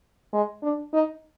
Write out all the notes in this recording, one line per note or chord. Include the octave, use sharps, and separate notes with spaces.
G#3
D4
D#4